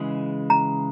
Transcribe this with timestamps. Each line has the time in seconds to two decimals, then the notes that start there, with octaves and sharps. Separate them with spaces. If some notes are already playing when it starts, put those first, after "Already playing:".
Already playing: C#3 E3 G#3
0.50 A#5